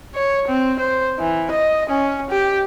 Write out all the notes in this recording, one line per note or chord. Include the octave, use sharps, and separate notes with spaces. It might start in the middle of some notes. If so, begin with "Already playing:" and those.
C#5
C4
C5
E3
D#5
C#4
G4